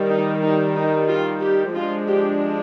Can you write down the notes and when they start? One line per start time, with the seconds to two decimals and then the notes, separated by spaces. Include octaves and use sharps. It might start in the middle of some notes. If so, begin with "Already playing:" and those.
Already playing: D#3 G3
0.09 D#4
0.42 D#4
0.76 D#4
1.09 F4
1.41 G4
1.75 F3 G#3 D4 F4
2.08 G4